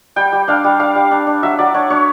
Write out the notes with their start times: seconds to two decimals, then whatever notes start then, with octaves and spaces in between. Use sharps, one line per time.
0.16 G3 G5
0.32 G3
0.48 D4 F5
0.64 G3
0.80 D4 F5
0.95 G3
1.11 D4
1.27 D4
1.43 F#3 E5
1.58 F#3 D5
1.74 D4 C#5
1.90 D4 C#5